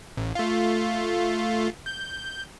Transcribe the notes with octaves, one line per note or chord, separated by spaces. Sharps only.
A1
A3 F4
G6